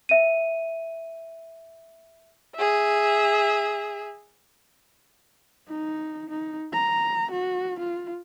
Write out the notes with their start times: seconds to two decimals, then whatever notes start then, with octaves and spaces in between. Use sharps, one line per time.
0.09 E5 D#7
2.55 G#4 E5
5.68 D#4
6.30 D#4
6.73 A#5
7.32 F#4
7.79 F4